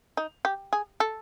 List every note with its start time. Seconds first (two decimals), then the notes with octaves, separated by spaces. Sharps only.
0.17 D#4
0.45 G4
0.73 G#4
1.00 A4